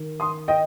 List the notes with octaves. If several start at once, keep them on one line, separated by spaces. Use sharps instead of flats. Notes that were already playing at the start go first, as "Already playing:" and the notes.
Already playing: D#3
C6 D#6
D#5 G5